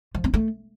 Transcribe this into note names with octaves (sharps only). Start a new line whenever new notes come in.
F3
C4
A3